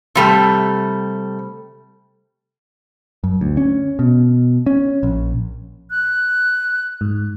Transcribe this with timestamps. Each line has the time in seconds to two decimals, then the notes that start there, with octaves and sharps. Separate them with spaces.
0.15 C3 G3 A3
3.24 F#2
3.41 D2
3.57 C#4
3.99 B2
4.66 C#4
5.03 A#1
5.91 F#6
7.01 G#2